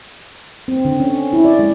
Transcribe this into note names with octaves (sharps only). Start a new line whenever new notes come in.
C4
D3
C#4
E4
D5
G#3